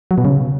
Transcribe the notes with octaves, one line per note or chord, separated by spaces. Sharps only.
F#3
B2
C#3